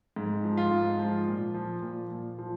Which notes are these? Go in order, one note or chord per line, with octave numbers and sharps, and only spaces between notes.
G#2
F3
F4
G#2
F3
A#2
F3
A#2
A#2
F3